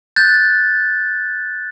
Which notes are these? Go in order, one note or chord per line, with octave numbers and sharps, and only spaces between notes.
F#6 G6 A6